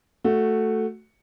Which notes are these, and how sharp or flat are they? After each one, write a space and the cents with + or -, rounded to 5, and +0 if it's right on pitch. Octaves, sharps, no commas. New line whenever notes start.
A3 +0 F#4 +0